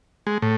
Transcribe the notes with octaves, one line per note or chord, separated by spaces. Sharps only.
G#3
A2